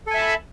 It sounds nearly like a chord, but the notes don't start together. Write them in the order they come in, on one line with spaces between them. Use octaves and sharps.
A4 G#5 E5 A5 B5